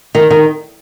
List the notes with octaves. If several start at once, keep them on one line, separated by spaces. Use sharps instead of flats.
D#3
D#3